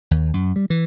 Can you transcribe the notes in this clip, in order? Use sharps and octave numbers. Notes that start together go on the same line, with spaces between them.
D#2
F#2
G3
E3